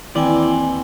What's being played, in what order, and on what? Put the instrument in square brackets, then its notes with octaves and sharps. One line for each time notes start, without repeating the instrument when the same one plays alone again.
[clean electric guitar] D#2 D5 [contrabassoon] E3 [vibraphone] C4 G5 G#5